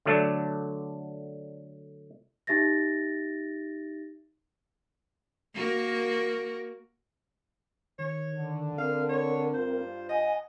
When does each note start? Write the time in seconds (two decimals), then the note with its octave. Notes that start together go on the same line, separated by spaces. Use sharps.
0.06 D3 F#3 A3 D4
2.47 D#4 G4 E5 A6 A#6
5.54 A#3 F#4 A#4
7.99 D#3 C#5
8.35 D3
8.78 C4 A#4 F5
9.09 C#5
9.54 G2 F4 C5
10.09 D#5 F#5 G#5